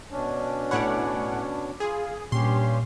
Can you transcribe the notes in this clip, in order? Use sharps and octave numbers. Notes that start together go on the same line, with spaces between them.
B2 C#4 D4
A2 C#5 F#5 B5 D6
F4 G#4
G2 A#2 C#4 G4 C6